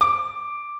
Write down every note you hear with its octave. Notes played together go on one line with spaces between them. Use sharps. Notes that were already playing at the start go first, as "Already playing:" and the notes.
D6